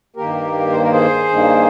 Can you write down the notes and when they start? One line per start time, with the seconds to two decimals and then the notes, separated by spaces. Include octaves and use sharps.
0.16 G2 D#3 A#3 G4 A#4
0.72 C5
0.82 A#4
0.92 G#4 C5
1.29 G2 D#3 A#3